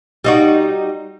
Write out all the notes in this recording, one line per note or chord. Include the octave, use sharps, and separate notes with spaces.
G3 D#4 F#4